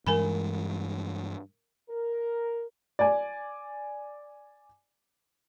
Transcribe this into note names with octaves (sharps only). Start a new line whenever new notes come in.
G2 E3 G#3 A#4 G#5 B5
A#4
D5 G#5